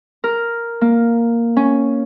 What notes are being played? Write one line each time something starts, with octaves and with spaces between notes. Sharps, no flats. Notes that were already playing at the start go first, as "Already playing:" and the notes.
A#4
A#3
C#4